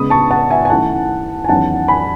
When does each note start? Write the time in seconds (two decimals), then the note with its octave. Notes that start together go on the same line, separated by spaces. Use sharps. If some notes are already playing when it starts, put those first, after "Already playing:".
Already playing: C#3 G#3 B3 B5 D#6
0.10 A5 C#6
0.31 F#5 A5
0.50 E5 G#5
0.65 G#5
0.70 F#2 D#3 A3 E4 F#5 A5
1.44 G#5
1.48 E2 D#3 F#3 C#4 F#5 A5
1.88 G#5 B5